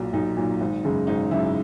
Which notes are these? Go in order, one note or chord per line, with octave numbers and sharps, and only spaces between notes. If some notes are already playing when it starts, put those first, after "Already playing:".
Already playing: B1 A#2 F#3
B1 D#4
A#2 F#3
G#1
F#2 C#3 G#3
G#1 D#4
F#2 C#3 G#3 E4